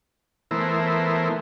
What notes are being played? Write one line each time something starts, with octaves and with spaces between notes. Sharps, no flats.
E3 A3 B3 E4 A#4 C5